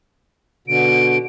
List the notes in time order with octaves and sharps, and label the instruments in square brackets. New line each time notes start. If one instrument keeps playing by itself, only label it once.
[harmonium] B2 D3 [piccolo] D7